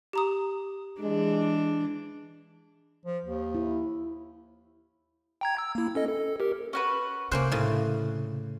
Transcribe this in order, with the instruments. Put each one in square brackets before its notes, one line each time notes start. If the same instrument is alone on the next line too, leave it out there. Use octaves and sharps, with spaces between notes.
[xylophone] G4 A#5 D#6
[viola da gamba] E3 D4 [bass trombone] G#3
[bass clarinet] F3
D#2
[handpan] E4
[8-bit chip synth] G5 A#5 G#6
E6
A#3 E4
C#4 A4 D#5
A4
G4 A#4
[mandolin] C#4 F#4 B4
[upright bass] C3 [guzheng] A#3 C#4 C5 [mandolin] F#6
[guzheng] A2 C#3